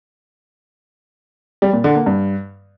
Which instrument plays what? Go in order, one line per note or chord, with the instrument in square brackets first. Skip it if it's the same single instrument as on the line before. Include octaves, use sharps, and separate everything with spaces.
[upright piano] G3
A#2
D3
A#3
G2